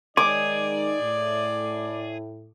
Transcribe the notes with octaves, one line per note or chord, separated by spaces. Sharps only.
D#3 G#3 D#4 G#4 D5 D6
A2